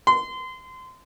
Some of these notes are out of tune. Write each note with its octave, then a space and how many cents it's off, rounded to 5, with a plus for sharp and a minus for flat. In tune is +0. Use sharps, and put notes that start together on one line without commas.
C6 -25